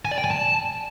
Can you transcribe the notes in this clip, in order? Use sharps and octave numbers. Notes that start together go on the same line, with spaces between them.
G#5
D5
G5
G#5
A5